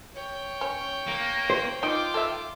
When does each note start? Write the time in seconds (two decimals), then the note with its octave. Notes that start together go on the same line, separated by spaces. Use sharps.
0.15 C#5 G5
0.61 C#4
1.07 A#3
1.50 C5
1.83 D#4 F4 D#5 G5 D6
2.14 A4 E5